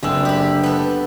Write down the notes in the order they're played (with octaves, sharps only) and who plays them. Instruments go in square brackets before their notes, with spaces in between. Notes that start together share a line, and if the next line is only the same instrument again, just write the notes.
[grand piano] F#1 E6 [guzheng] D3 G#3 C4
[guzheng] G4 B5
B3 A4